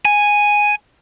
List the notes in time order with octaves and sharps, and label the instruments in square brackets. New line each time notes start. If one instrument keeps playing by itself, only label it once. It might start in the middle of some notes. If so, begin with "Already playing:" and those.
[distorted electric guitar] G#5